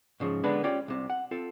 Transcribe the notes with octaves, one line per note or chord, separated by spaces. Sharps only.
G#2 C#3 F3
D3 G#3 B3 D4 B4
C#4 F4 G4 C#5 D5
C2 C3
F#5
C4 F4 A4